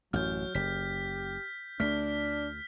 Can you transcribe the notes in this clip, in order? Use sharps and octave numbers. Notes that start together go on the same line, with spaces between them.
A1 F#2 F#3 F6 G6
F#1 G4 B6
D2 A3 D4 F6 B6